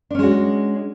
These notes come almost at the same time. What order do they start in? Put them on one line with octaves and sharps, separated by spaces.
D4 C#4 G#3 F#4